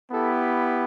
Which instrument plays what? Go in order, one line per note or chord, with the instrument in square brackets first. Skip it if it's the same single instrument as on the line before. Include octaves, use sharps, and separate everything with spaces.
[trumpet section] B3 E4 G4 A4